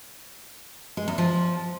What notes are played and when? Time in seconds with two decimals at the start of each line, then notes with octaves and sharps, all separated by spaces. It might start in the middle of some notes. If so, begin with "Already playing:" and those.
0.97 G#3
1.08 E2
1.18 F3